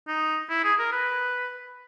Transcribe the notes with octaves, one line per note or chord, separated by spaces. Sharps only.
D#4
E4
G#4
A#4
B4